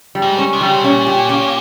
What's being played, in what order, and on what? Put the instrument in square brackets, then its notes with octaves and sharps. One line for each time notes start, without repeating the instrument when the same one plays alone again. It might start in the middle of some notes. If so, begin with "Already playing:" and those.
[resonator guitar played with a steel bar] G3
[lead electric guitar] G#2
[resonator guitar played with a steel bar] C#4
[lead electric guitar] C3
[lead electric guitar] C#3 [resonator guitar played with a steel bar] G3
[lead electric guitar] C3
[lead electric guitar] A#2 [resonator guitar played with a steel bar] C#4
[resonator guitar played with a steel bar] G4
C#4